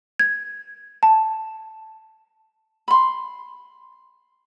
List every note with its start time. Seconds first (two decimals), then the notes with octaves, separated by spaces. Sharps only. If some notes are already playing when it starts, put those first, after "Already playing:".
0.19 G#6
1.03 A5
2.88 B5 C6